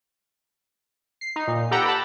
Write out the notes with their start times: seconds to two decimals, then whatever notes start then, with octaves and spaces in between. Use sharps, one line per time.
1.21 C7
1.36 D#4
1.47 A#2
1.71 G4 A4 B4 F#5 G5 A#5
1.86 A5 B5